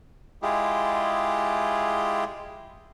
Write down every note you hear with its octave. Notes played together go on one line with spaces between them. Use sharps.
G#3 E4 F4 G4 G#4